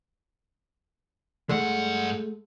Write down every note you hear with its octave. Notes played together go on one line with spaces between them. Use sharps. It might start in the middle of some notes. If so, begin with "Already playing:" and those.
G2 G#3 A3 F#5